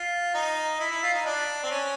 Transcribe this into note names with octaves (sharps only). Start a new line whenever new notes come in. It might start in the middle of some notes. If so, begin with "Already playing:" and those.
Already playing: F4
D#4
E4
E4
F4
D#4
D4
C4
C#4